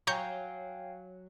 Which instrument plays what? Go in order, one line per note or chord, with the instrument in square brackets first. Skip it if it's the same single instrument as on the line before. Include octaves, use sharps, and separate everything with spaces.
[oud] F#3 [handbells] F5 G5 G#5 [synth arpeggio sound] A#5 C#6 G6